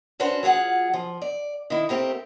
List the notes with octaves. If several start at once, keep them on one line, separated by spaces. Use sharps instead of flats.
C#4 D4 F#4 B4 C5
F#3 F4 G#4 F#5
F3
D5
D#3 E4
A3 C4 G4 A#4